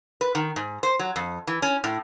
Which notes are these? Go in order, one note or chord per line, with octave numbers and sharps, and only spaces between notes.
B4
D#3
G#2
C5
F#3
F2
E3
C#4
A2